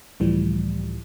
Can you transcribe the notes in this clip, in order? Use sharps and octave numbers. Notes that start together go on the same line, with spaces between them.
C#2 A2 E3 F3 G3